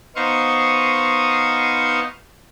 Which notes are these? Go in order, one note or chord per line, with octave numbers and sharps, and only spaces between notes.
B3 D#4 C5 F5 C#6 D#6